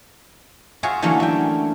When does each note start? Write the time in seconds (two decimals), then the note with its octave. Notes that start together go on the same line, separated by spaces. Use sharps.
0.83 F4 F#4 G#4 C#5 E5
1.02 D3 E3 F#3 A3 A#3 C#4
1.20 E5 G5